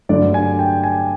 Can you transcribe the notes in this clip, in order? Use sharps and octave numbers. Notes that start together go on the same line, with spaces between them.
G2 D3 F#3 A3 D5
G#5
G5
G#5